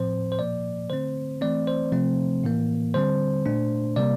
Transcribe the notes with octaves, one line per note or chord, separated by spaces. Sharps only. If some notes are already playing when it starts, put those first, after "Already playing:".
Already playing: A2 F3 C4 C5
C5
A#2 F3 A#3 D5
D3 A3 C4 C5
E3 A3 C4 D5
C5
C3 F3 A3 C4
A2 E3 A#3
D3 G3 C4 C5
A#2 A3 D4
C3 G3 A#3 D5